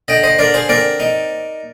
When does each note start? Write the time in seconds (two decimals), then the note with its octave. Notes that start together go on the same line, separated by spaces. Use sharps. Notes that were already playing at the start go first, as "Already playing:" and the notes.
0.08 D3 D#5 G5
0.23 C5 D#5
0.39 D3 A#4 D5
0.54 G#4 C5
0.69 C4 A#4 D5
1.00 D#4